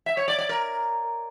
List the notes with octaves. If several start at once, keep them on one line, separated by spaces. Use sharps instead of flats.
E5
C#5
D5
D5
A#4